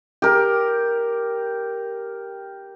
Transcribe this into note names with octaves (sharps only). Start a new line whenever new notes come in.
G4 A#4